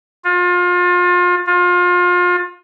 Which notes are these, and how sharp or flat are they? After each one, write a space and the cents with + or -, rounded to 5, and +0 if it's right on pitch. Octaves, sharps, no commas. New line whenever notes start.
F4 +30
F4 +30